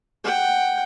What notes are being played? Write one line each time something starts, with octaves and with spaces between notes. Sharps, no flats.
F#5 G5